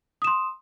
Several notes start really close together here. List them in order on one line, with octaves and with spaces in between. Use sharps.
D#6 E7 C6